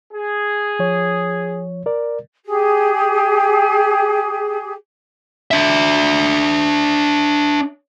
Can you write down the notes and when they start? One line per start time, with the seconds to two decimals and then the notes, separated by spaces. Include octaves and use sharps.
0.13 G#4
0.79 F3 C#5
1.86 A#4 D5
2.45 G4 G#4
5.51 D4 E5